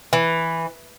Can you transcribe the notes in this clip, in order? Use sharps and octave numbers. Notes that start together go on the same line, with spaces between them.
E3